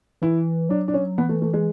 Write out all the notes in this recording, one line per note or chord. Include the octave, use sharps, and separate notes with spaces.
E3 E4
F#3 D4
D4
C#4
E3 B3
A3
A3
G#3